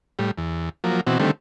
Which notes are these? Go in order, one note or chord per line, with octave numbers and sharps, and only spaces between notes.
A2 G3
E2
F3 F#3 A#3
B2 E3 C4 F#4
D3 D#3 G3 A3 C4